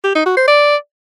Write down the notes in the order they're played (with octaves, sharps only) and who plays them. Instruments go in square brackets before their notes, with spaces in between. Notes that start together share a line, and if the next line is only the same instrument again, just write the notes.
[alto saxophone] G4
D#4
F#4
C5
D5